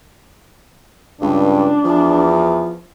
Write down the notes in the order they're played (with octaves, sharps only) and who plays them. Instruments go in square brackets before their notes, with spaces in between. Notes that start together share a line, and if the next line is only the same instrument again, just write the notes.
[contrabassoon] C#2 [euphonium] G2 [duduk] D4
[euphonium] E2 [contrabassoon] F3